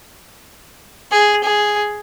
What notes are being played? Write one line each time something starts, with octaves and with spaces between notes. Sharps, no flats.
G#4
G#4